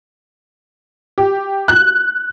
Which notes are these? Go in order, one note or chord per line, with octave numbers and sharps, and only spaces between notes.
G4
F#6